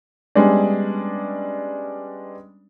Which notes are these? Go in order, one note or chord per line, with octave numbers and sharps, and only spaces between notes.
G3 G#3 B3 C#4 D4